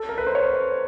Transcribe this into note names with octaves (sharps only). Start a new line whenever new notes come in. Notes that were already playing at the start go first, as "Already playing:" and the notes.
Already playing: A4
A#4
B4
C5
C#5